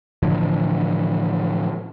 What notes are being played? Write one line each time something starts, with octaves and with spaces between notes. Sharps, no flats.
A2 D3 E3 F3